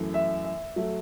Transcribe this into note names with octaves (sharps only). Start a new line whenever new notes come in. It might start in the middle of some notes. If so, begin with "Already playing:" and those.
Already playing: F#2 E3 A3
E5
E5
F#3 A3 E5